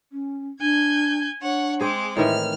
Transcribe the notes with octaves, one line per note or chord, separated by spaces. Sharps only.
C#4
D4 G#5 G6 G#6
D4 C#5 F#5
G#3 C4 G#4 D6
A2 D#3 E3 E5 F6